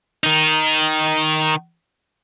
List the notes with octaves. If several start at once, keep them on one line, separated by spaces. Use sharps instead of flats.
D#3 D#4